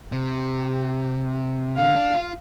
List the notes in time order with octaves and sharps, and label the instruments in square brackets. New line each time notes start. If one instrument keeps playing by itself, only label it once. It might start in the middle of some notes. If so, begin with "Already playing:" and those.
[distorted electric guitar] C3 [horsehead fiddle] G4
[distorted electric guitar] D3 [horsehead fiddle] F5
[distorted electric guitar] D4
F4